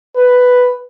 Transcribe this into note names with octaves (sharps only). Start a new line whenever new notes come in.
B4